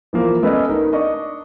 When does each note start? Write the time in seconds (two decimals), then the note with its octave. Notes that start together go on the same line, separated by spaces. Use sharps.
0.13 E3 F3 A#3
0.43 A3 B3 C#4 B4 D5 D#5
0.69 D#4 A#4
0.92 D4 D#5 C#6